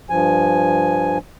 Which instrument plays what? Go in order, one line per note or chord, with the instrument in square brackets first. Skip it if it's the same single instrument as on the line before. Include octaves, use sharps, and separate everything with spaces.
[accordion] G2 F3 G#5